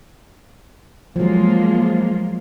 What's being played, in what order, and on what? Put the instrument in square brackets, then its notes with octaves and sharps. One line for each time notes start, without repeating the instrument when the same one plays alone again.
[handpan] F3 F#3 [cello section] G#3 A#3 F4